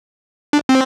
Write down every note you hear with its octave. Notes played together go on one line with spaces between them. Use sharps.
D4
C4